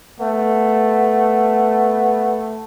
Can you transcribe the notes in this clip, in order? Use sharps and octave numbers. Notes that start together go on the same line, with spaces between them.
A3 B3